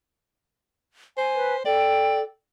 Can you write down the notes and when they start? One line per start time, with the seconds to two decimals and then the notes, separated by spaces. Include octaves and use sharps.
1.17 C5 G#5
1.35 B4
1.65 A4 D5 G5